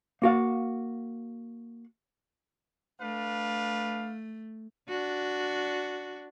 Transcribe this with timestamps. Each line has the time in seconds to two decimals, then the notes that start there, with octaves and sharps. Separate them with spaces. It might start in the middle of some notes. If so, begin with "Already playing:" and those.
0.22 A#3 F#4 F5
3.00 A3 D4 B4 F5
4.88 D4 F#4